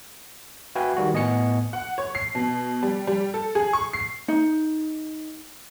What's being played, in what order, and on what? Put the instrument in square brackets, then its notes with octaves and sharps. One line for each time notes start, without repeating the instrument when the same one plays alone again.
[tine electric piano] F#4 B4 E5 F5 G5 G#5
D#3 G3 F#4
A2 B3 D#5 G#5 C#6 C#7
[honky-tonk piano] F#5
C#5
C7
B2
G3
G3
A4
G#4
C#6
C7
[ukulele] D#4